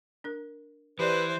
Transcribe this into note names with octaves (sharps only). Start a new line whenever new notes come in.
D4 A#4
E3 G4 B4 C5 D5